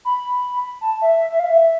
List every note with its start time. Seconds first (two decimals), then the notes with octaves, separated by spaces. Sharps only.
0.05 B5
0.81 A5
1.02 E5
1.20 E5
1.30 E5
1.39 F5
1.49 E5